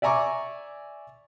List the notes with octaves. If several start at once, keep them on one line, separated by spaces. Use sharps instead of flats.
D5 E5 G#5 A#5 C#6 D6